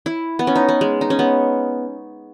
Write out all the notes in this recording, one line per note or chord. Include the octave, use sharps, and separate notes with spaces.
E4
B3
C#4
D#4
B3
G#3
D#4
C#4
B3